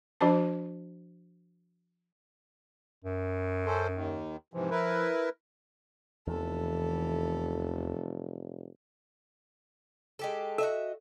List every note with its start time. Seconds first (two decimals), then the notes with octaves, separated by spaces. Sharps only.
0.21 F3 D4 F#4 C5 A5
3.04 F#2
3.66 C#4 A4 C5
3.95 D#2 D#3
4.54 G#2 C3 E3 F3
4.71 E4 A#4 B4
6.27 F1 E2 E3 A4
10.19 G#3 G4 A4
10.58 F#4 A4 D#5 E5